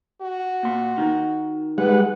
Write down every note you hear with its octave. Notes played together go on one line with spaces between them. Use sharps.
F#4
A#2 C6
D#3 D#4
G3 G#3 B4 F#5